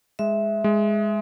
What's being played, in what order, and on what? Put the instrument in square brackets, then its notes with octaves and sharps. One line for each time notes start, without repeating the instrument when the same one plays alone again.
[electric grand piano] G#3 [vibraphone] E5
[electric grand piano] G#3